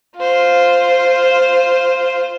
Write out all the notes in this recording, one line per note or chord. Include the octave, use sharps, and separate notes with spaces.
F4 C5